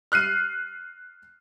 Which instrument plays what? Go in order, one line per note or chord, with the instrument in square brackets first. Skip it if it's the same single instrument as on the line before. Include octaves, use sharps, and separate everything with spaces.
[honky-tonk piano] F6 F#6 C7 D#7